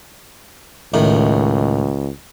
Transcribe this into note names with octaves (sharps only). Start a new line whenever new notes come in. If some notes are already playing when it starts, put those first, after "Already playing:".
C#2 A2 D#3